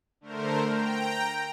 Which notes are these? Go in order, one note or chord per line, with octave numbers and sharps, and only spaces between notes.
D3 A3 A#4 C5
G5 A#5